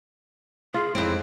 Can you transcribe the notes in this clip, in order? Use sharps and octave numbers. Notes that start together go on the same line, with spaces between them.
F4 G#4
F2 G#3 C4 C#4 D#4 E4